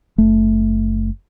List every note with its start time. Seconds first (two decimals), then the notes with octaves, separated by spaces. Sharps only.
0.18 F#1 A3